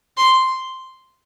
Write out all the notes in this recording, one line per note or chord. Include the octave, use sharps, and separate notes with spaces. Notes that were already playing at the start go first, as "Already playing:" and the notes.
C6